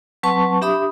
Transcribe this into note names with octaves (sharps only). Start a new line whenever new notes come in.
F#3 C4 B4 A5 C#6
D4 G4 E5 B5 D#6